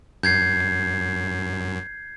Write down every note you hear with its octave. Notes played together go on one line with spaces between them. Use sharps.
F#2 G6 G#6 C7